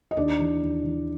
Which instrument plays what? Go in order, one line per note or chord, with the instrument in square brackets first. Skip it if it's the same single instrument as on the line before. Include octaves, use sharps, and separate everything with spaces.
[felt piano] D#5
D#2 D4 D5
E3
D#2
E3